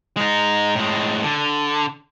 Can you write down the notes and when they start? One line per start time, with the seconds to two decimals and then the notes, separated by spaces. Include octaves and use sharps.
0.17 G#3 D#4
0.75 A2 G#3
1.23 D3